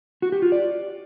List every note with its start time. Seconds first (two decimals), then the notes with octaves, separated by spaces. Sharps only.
0.22 F#4
0.32 G4
0.42 F4
0.52 D5